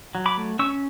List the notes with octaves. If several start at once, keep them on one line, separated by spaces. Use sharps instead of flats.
F#3
B5 D6
A3
C#4 C#6 E6